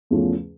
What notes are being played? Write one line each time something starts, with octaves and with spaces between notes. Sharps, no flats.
E2 C#3 F3 A3 C#4